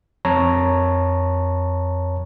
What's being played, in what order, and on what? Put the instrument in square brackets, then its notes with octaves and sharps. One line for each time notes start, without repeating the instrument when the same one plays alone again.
[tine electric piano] F2 C#5 A5 A#5